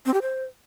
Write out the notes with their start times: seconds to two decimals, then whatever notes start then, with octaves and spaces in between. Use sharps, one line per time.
0.06 C4
0.14 G4
0.22 C5